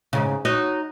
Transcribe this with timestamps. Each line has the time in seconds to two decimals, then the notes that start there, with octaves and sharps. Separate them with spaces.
0.13 G#2 C#3
0.45 D#4 F#4 C#5